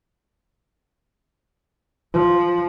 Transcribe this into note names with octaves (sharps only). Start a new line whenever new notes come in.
F3